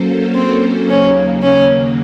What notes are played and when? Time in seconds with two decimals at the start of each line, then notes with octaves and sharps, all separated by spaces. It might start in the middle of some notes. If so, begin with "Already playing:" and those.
Already playing: F#3 A#3 C#4 A4 C5
0.34 C4
0.87 D#2 C#3 F#3 A#3 C#4
1.41 C#4